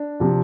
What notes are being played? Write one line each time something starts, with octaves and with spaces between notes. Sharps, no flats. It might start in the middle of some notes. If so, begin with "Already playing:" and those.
Already playing: D4
C3 F3